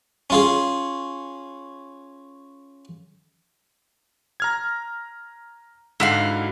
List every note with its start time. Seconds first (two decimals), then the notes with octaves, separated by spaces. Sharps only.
0.30 C#4 F4 G#4
4.40 A#5 F6 G#6
6.00 G#2 D3 E4 F#4 F5